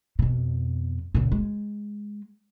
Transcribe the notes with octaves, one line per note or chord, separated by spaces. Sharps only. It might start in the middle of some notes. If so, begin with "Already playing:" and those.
F2 B2
C#2 A#2
G#3